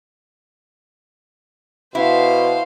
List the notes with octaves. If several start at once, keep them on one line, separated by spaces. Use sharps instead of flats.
B2 E4 C5 F5